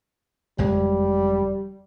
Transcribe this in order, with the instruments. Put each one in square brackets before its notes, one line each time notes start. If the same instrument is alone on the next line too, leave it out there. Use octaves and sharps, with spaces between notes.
[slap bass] F#1 F2 G#3 [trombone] G3